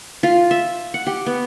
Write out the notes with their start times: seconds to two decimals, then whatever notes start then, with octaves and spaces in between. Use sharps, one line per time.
0.23 F4
0.51 E5
0.94 F#5
1.07 G4
1.26 B3